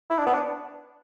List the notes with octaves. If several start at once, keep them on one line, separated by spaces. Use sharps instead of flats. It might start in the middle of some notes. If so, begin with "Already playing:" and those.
E4
D4
B3
D4